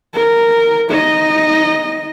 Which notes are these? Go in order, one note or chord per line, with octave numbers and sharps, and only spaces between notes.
A#4
D#4 D#5